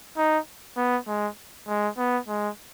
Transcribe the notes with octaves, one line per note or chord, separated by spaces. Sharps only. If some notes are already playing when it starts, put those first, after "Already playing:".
D#4
B3
G#3
G#3
B3
G#3